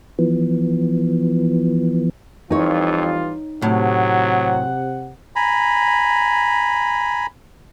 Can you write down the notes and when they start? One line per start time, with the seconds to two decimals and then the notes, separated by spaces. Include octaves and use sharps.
0.19 E3 F3 B3
2.51 F2 E3 G3 D#4 F4 C#5
3.62 A2 C3 F#3 F#5
5.36 G#5 A#5 B5